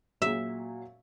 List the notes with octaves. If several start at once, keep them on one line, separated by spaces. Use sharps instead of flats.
A#2 F#3 E5